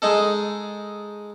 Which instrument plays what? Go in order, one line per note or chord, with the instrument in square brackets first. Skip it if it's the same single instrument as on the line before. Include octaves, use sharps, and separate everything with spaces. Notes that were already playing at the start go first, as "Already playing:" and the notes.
[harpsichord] G#3 D#4 A4